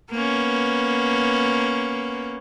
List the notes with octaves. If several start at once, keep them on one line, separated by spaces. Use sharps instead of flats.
A#3 B3 C#4